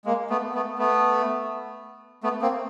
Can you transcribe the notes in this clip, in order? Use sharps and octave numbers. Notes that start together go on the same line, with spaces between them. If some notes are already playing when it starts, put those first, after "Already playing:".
G#3 A#3
A3 B3
A3 B3
A3 B3
A3 B3
A#3 C4